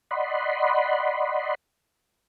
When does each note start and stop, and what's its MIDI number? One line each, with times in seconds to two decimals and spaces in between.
0.11 1.55 74
0.11 1.55 75
0.11 1.55 78
0.11 1.55 83
0.11 1.55 84